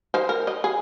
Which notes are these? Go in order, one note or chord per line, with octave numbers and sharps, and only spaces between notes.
D#4 C5
A#4
D#5
G#4